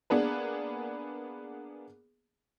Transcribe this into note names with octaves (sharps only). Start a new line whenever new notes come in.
A#3 B3 D4 G#4 B4